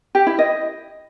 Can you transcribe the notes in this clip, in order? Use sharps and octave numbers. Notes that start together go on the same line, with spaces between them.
G4
E4
D#5